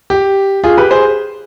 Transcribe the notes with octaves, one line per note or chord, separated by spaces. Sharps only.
G4
F4 G#4
G4 B4
G#4 C5